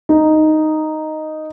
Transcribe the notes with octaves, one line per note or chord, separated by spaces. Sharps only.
D#4